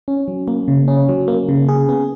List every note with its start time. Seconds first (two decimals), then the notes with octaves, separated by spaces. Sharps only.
0.08 C#4
0.28 F#3
0.48 A#3
0.68 C#3
0.88 C#4
1.09 F#3
1.28 A#3
1.49 C#3
1.68 G#4
1.89 B3